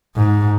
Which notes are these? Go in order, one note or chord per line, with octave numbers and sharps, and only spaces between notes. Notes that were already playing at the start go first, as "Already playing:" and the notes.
G#2